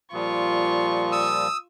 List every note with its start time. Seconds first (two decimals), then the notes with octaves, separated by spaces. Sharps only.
0.13 A#2 F3 G3 F4 C#6
1.12 D#6 E6